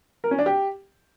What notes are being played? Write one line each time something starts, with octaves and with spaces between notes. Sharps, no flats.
A#4
C#4
D4
G4